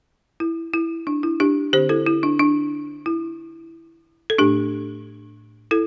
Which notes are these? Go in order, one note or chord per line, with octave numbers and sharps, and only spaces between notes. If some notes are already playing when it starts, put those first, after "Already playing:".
E4
E4
D4
E4
D4 G4
D3 C4 G4 C5
E4 A4
E4
D4
D4
E4
A4
A2 A3 D4 G4
E4 A4